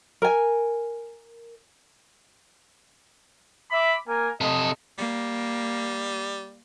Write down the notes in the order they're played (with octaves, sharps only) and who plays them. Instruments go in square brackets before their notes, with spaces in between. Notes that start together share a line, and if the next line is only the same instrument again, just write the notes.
[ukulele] A#4 G#5
[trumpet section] E5 B5 D6
A#3 A#4 G#5
[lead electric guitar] C3 A4 [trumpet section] D#5
[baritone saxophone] G3 [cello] A#3